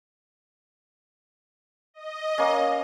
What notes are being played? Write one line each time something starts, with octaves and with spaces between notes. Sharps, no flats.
D#5
A#3 C#4